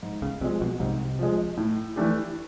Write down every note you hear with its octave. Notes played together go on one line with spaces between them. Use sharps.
G#2
C#2 C#3
C2 C3 F3 G#3
B1 B2
C2 G#2 C3
F3 G#3
A2
E3 A3 D4 G4